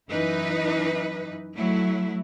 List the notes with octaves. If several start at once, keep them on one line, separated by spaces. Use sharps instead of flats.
F#2 E3 D#4 E4 B4
F#3 A3 E4